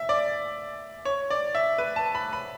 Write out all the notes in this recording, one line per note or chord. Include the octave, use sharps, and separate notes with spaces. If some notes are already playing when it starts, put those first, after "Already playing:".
Already playing: E5
D5
C#5
D5
E5
B4
A5
B5
B5